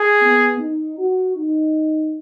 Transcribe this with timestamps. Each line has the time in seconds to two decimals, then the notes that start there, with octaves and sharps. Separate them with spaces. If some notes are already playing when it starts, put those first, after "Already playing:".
Already playing: G#4
0.22 B3
0.60 D#4
0.99 F#4
1.36 D#4